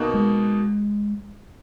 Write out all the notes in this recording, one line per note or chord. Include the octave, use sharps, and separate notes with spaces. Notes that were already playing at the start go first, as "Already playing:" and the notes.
Already playing: B2 A#3 D#4 F#4
G#3